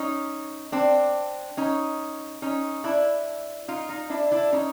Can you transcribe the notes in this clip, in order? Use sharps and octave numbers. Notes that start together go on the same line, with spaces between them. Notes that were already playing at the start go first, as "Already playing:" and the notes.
Already playing: C#4 D#4
C4 D4
C#4 D#4
C#4 D#4
D4 E4
D#4 F4
D#4 F4
D4 E4
D4 E4
C#4 D#4